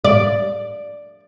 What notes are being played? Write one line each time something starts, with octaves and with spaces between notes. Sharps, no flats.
D5